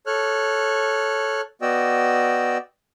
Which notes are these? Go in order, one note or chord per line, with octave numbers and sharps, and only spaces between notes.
A4 C#5 F6 F#6
B3 F#4 D5 D#5 G5 E6